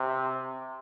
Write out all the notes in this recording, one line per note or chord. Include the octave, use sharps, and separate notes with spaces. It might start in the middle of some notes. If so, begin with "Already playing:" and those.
Already playing: C3